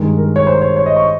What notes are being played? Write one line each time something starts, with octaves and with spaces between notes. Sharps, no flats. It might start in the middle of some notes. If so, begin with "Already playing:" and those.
Already playing: G2 D#3 G#3
A#4
C#5
C5
C#5
C#5
D#5
C#6